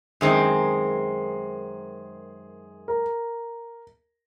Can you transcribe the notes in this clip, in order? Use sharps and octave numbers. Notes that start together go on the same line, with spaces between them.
F#2 D#3 G#3 C4 G#4
A#4